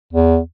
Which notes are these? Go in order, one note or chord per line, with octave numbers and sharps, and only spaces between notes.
E2